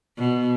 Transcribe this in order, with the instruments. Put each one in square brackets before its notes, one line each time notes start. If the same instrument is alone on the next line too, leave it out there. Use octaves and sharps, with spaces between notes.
[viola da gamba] B2